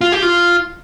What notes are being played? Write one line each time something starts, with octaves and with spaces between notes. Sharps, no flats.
F4
G4
F4